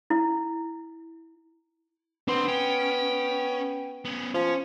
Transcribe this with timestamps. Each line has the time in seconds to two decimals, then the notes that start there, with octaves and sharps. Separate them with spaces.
0.10 E4
2.28 B3 C4 D4 C6
2.48 C#4 G5
4.05 B3 C#4
4.34 F3 C#4